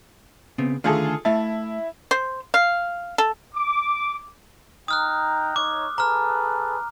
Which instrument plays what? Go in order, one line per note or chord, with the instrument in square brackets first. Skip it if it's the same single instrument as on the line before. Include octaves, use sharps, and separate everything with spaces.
[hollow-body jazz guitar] C#3 B3 C4
[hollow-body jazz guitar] D3 D#3 A3 [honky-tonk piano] F4 G#4 A4
[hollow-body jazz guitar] A3 F5 A5 [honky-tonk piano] E4
[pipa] C5
F5
A4
[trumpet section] D6
[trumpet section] D#4 G5 A#5 [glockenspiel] D#6 F6 F#6
[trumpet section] D#4 C#5 [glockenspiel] D6
[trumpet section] G#4 A4 B4 [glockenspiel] A#5 F6